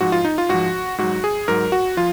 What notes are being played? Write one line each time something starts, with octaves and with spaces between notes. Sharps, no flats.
G#2 F3 F#4
F4
D#4
F4
G#2 F3 F#4
G#2 F#3 F#4
G#4
G#2 F#3 A#4
F#4
F3 F4